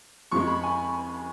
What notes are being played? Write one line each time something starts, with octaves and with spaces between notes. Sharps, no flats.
F2 F3 G#3 C#6
B5
G#5